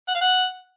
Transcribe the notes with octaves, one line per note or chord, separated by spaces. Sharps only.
F#5
F5
F#5